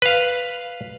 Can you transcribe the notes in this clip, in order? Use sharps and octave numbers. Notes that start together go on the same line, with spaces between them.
B4 F5